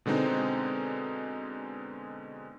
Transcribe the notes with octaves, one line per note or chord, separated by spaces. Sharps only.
B2 D3 G#3 C4 D#4